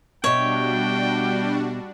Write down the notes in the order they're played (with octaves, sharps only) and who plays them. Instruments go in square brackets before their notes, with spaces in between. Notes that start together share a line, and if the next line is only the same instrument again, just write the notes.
[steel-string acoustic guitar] B2 E5 [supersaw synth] G3 D4 F#4 [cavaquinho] C#5 [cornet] G5